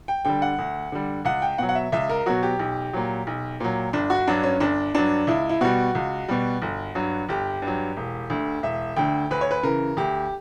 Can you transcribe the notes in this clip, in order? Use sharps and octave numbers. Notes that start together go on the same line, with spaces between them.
G5
D3 G3 G5
F#5
D2
D3 G3
C#2 F#5
G5
B2 F#3 F#5
F#5
E5
C#2 E5
A#4
B2 F#3 F#4
G4
B1
A#2 F#3
B1
A#2 F#3
G1 D4
F#4
G2 F#3 D4
C#4
G1 D4
G2 F#3 D4
C#2 E4
E4
B2 G3 F#4
C#2
B2 G3
G1
G2 F#3
G1 G4
G2
F#3
E1
D2 D3
E1 E5
D2 D3 G5
D2 B4
C#5
B4
C#3 E3 A#4
D2 G4